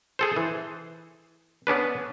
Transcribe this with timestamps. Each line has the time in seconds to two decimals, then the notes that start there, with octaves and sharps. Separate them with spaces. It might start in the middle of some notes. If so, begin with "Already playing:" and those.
0.19 G#4 A4 C5
0.36 E3
1.67 B3 C#4 D4 B4